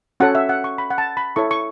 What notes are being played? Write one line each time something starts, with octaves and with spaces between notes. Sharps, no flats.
C#4 F#4 A4 C#5 F#5
E5
F#5
C#6
B5
F#5
A5
B5
E4 A4 C#5 C#6
C#6